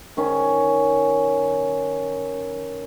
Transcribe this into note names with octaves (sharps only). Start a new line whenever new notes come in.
D#3 C#4